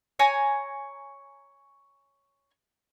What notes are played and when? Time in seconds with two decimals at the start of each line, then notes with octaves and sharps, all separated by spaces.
0.19 C#5 G#5 A#5